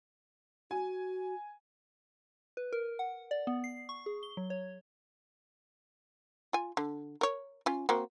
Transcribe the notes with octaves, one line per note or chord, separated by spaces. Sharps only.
F#4 G#5
B4
A#4
F#5
D5
B3
C7
C#6
G#4
G7
F#3
C#5
F4 G#5
D3
A#4 C#5
C#4 F4
A#3 C4 F#4